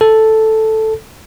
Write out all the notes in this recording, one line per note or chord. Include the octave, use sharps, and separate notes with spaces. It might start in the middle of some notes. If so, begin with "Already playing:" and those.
A4